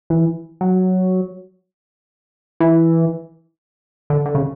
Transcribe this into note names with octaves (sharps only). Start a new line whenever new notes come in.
E3
F#3
E3
D3
D3
C#3